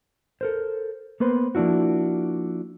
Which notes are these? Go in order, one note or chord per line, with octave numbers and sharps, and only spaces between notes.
A4 A#4 C5
A#3 B3 B4 C5
F3 A#3 D4 E4 F#4